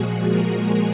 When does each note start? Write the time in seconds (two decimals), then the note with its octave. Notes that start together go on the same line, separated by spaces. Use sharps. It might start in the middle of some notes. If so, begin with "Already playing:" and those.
Already playing: A#2 F3 G#3 F#4 G#4
0.26 A#4